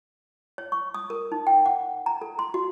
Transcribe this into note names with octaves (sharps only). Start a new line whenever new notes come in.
C#5
C#6
D#6
A#4
D#4
G5
F#5
A#5
A4
C6
F#4